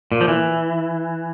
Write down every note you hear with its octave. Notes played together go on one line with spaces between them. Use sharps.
A#2
F3
E3